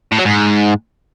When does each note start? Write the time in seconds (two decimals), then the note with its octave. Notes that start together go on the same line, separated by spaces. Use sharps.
0.12 A2
0.19 F#3
0.25 G#2